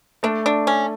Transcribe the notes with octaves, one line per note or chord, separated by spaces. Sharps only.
A3 D4
D4
C#4